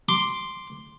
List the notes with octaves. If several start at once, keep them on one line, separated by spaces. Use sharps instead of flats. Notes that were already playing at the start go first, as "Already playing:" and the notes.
C6 D6